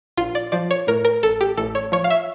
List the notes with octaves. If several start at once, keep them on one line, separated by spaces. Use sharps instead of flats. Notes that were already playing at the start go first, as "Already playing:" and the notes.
A#1 F4
D5
F3 D5
C#5
A2 A#4
A#4
A1 A4
G4
A1 A4
C#5
F3 C#5
F5
E5